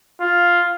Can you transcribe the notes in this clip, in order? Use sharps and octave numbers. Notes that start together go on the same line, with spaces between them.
F4